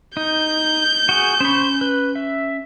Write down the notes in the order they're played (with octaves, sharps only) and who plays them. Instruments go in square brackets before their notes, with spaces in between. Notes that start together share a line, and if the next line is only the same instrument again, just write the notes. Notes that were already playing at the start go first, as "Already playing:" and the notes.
[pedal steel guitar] D#4 [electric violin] G6
[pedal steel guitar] F#4 G#4
[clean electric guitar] C#4 B5 [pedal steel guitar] C5 C#6
[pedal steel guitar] B4
E5